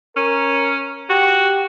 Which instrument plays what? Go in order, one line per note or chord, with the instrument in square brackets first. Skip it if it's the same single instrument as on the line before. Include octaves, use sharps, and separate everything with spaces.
[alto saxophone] C#4 [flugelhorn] A#4
[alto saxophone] F#4 [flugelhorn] G4